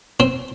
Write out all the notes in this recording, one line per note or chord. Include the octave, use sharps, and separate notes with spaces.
C4